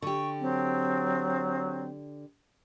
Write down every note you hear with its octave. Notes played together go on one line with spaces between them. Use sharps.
D3 G4 C#6
F#3 C4